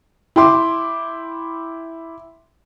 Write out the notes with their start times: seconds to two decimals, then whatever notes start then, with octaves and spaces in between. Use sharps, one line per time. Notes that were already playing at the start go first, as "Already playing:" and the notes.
0.36 E4 G5 C6 D6